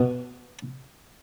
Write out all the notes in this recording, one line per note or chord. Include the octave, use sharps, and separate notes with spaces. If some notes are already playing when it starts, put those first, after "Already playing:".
Already playing: B2